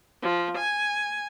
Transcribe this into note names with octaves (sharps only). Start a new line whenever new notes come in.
F3
G#5